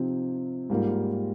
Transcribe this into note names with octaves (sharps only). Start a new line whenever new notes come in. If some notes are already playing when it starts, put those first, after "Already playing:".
Already playing: C3 F3 C4 D#4
G#2 G3 A#3 F4 A#4